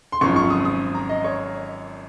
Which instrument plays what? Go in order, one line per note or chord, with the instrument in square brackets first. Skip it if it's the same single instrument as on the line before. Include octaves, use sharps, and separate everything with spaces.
[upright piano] C6
G#1 F#2 F3 C#6
C#6
D#6
D#6
A#5
D#5
C#5